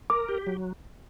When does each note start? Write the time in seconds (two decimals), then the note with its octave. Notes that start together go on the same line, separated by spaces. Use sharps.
0.10 A#4 D6
0.29 G4
0.47 F#3